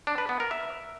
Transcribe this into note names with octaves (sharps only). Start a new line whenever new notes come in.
D4
B4
B3
A#4
E5